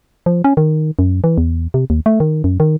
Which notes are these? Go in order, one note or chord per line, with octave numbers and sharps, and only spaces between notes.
F3
C#4
D#3
F#2
E3
E2
C3
D#2
A3
D#3
F#2
D#3